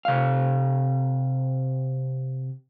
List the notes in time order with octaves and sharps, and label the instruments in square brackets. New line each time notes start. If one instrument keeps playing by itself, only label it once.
[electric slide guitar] C3 F5